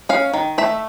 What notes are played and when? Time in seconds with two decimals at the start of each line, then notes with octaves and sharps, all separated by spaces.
0.09 C#4 F5
0.33 D#3
0.58 A3 E5